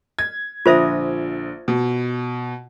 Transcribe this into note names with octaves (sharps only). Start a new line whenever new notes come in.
G#6
A#1 D3 F4 C5 E5 D#6
B2